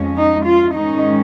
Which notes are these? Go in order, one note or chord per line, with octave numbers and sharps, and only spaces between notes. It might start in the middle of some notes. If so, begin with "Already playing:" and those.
Already playing: F2 F3 G#3 C#4
D#4
F4
G#2 D#3 G#3 C#4 D#4